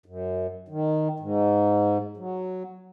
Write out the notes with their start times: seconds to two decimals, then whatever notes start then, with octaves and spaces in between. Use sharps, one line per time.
0.06 F#2
0.68 D#3
1.20 G#2
2.17 F#3